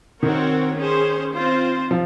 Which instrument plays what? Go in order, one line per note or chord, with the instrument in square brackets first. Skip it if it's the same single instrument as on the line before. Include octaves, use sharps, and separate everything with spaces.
[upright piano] D#3 [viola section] C4 F#4 A#4 C#5
[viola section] C#4 G#4 C5
C4 F4 C5
[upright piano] F3